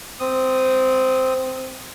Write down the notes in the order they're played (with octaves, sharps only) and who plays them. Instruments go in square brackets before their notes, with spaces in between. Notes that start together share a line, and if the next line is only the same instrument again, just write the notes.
[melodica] C4 D#6